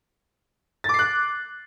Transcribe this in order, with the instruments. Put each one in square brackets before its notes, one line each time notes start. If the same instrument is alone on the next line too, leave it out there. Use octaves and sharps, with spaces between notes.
[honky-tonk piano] A6
D6
C7
F#6